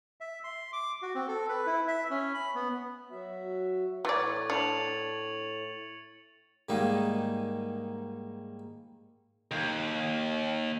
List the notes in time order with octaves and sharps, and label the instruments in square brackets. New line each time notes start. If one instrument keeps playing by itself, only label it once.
[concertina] E5
C6
D6
F#4
C4
A4
B4
E4
E5
C#4
B5
B3
[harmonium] F#3 F#4 E5
[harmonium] A2 [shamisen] E3 D5 [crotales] C#6 G#6 A6
[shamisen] D4 [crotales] C#7 F7 F#7
[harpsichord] G#2 D#3 G3 A#3 D#4 G#4
[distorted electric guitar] D#2